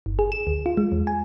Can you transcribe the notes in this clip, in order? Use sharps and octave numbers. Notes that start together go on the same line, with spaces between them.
G1
G#4
E7
D2
F4
G#3
E2
G#5